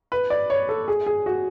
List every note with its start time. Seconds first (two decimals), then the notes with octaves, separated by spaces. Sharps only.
0.12 B4
0.30 D5
0.50 C#5
0.69 A4
0.88 G#4
1.06 G#4
1.26 F#4